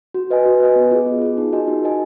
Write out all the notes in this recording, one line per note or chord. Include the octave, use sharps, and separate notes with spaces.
F#4
B4 D#5 G#5
F#4
B4 D#5 G#5
B3
F4 G#4
B3
F4 G#4
D#4
F#4 A#4 D#5 G#5
D#4
F#4 A#4 D#5 G#5